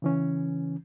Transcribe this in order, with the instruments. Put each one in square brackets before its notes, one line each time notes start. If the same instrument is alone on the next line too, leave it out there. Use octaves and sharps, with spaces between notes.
[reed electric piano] C#3 E3 C#4